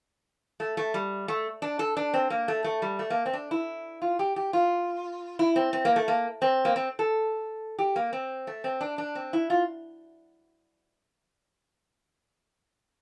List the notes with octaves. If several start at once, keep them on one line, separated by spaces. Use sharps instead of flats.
A3
A3
G3
A3
D4
A4
D4
C4
A#3
A3
A3
G3
A3
A#3
C4
D4
E4
F4
G4
G4
F4
E4
C4
C4
A#3
A3
A#3
C4
A#3
C4
A4
G4
A#3
C4
A3
C4
D4
D4
C4
E4
F4